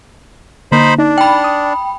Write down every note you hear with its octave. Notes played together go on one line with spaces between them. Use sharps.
D3 A#3 D#4 C5 B5
D4 D#4
G5 B5
D#6